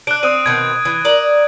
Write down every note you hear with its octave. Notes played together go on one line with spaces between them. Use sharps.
D4 F#6 D7
C4 D#6 F#6 D#7
B2 D#3 C4 G#6
E3
A#4 D5